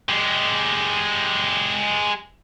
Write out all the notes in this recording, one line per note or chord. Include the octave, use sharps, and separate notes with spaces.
G#3 G4